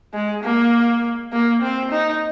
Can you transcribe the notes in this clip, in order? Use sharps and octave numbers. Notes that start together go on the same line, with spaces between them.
G#3
A#3
A#3
C4
D#4